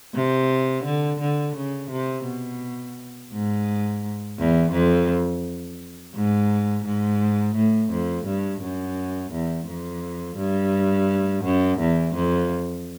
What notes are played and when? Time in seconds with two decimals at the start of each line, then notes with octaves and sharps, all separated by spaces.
0.15 C3
0.85 D3
1.20 D3
1.56 C#3
1.91 C3
2.26 B2
3.33 G#2
4.38 E2
4.73 F2
6.15 G#2
6.85 G#2
7.55 A2
7.91 F2
8.25 G2
8.61 F#2
9.32 E2
9.67 F2
10.37 G2
11.44 F#2
11.80 E2
12.15 F2